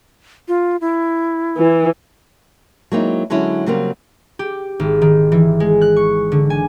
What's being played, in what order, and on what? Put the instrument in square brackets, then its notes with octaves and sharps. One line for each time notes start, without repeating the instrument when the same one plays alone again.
[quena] F4
E4
[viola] E3
[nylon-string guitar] F#3 G#3 A#3 C4 D#4 E4
D3 F#3 G#3 C#4 E4
C#3 F#3 G3 A#3 C4 A#4
[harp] G4
G#1
D#3
E3
G#3
F#6
C#6
D3
G#5